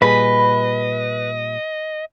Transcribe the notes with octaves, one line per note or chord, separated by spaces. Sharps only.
A#2 G3 G#4 B4 D#5 B5